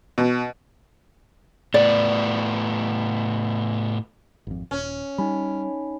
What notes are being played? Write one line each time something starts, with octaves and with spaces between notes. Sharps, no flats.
B2
A2 B3 D5
G#1 F2
D#1 C#4
G3 D#4 G#5 B5